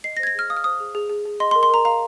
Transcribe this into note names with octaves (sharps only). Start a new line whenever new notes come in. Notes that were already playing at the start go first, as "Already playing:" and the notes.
D#5 C7
A#6
C5 G#6
A#6
G#4 F6
F5 D#6
F6
C5 D#6
G#4
G#4
G#4
G#4
D#5 C6
C6
A#4
C6
A#4 A#5
F5 A#5